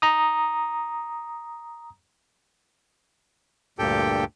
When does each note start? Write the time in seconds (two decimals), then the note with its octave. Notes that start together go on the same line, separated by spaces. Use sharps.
0.02 A#5 D#6
3.79 D2 G2 A#2 G4 A4 G5